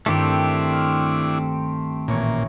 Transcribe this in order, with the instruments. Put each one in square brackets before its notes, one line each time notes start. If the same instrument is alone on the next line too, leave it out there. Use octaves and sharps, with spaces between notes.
[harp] G2 D#3 [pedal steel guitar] A3 C4 G4 [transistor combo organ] D4 E4
[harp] F6
[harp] A1 C#5 C#6 [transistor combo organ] A#2